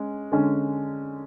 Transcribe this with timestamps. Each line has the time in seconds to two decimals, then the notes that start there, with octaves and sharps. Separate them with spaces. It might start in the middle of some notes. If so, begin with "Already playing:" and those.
Already playing: G#3 C#4
0.32 D3 G#3 C#4